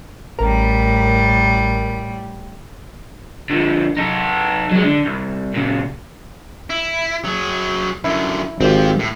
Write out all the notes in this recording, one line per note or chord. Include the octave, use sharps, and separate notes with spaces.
A1 A2 G3 A#4
D3 F3
D#4 A4
F#3 G#3
D3
C2
A#2 C#3
E4
F#3 G#4
F#2 D3 E4
G#1 C4 F4 G4
A2